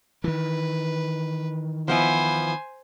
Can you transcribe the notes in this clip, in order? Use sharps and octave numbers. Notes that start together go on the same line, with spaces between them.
D#3 E3 B4
F3 B3 E4 C5 G#5